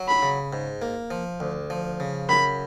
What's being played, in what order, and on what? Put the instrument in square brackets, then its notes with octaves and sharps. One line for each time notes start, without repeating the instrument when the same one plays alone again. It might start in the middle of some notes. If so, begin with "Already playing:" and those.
Already playing: [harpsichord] F#3
[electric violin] B5
[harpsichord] C#3
G#2
A#3
F3
D2
F3
C#3
[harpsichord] F#2 [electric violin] B5